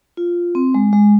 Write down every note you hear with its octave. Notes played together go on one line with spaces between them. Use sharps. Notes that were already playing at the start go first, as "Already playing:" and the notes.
F4
C4
G#3
G#3